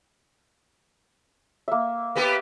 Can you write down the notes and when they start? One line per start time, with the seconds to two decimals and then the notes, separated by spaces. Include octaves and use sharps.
1.68 A#3 E5
2.15 A#3 B3 G4